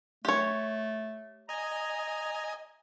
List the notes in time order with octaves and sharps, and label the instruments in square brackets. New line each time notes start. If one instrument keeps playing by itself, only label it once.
[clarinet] A3 [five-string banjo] G4 C#5
[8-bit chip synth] D#5 G#5 [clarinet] A#5